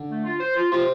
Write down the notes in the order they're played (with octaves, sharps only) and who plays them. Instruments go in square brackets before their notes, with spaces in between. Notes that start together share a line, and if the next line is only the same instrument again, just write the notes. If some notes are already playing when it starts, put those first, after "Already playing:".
Already playing: [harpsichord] D3
[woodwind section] A3
F4
C5
F4
[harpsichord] C3 [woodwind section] F4